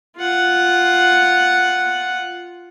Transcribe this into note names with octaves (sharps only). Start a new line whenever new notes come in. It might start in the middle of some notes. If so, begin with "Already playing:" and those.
F4 F#5